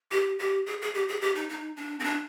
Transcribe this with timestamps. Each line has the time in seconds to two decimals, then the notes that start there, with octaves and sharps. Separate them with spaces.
0.11 G4
0.39 G4
0.66 G#4
0.82 G#4
0.94 G4
1.08 G#4
1.21 G4
1.35 D#4
1.49 D#4
1.77 D4
2.00 C4
2.04 D4